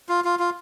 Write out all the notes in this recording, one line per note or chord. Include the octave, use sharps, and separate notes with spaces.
F4
F4
F4